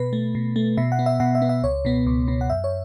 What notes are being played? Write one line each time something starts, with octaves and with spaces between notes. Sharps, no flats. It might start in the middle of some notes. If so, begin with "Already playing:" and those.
Already playing: B2 B4
A3
B2
A3
B2 E5
F#5
B3
E5
B2 F#5
E5
B3
E5
C#2 C#5
B2 B3
C#2
B2 B3
F#5
F#2 E5
C#5